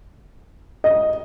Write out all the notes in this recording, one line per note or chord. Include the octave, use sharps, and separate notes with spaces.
D#5